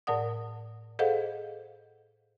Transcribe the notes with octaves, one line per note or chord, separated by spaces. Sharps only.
A2 A#4 D5 F#5 D#6
G#4 A4 C5 D#5 F5 F#5